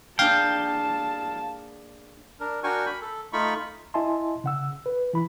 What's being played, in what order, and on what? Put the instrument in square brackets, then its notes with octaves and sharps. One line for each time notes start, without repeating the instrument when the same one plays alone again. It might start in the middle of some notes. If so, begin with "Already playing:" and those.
[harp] A#3 D4 G#4 [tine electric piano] F5 [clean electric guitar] G5 [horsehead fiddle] A5
[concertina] D4 A#4
D4 F#4 A#4 G5 G#5 C#6
B5
A4
A3 D#4 F4 B5 C#6
[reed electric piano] E4 D#5 E5 G#5 A5 C6
C#3 F#5 E6
B4
E3 E4 B5